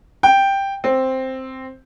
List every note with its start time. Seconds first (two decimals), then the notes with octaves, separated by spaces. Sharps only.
0.23 G5
0.84 C4